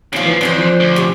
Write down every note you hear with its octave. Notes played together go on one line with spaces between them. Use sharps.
D#2 F3 C#4 F4
E3
F2 D3 C#4 C5
F3
D2
C3 C#4